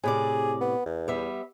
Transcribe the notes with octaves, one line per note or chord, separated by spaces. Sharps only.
A2 C3 G#4 D5
B3
E2
G3 B3 E5